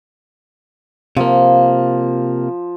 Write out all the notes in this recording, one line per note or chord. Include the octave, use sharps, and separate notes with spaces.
C3 F3 A#3